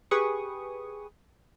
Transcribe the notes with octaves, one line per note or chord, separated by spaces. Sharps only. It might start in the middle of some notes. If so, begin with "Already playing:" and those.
G4 G#4 B4 C#6 D#6